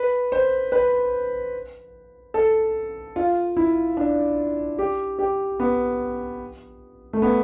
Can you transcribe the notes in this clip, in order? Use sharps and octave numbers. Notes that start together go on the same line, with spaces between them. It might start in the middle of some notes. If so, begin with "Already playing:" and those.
Already playing: B4
C5
B4
A4
F4
E4
D4
G4
G4
B3
A3
B3